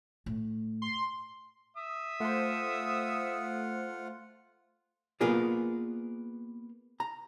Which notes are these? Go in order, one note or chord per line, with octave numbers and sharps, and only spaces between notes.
A2
C6
E5 D#6
A3 F4 C5 F#5
A#3 B3 F4 G#4 A#4 D5
A#5